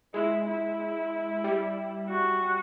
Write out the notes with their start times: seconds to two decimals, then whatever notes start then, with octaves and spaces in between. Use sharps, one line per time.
0.14 G#3 E4
0.47 E4
1.44 G3
2.08 F#4